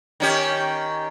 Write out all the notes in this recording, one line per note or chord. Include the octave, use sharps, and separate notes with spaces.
D#3 C#4 G4